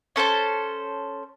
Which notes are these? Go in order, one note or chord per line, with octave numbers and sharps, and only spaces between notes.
C#4 A4 C5 A5